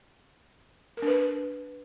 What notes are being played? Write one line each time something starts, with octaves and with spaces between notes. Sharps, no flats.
A#4
D4
B4